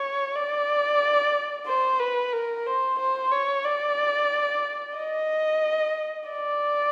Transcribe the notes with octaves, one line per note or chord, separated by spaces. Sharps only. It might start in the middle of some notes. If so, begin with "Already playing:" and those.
Already playing: C#5
D5
C5
B4
A#4
C5
C5
C#5
D5
D#5
D5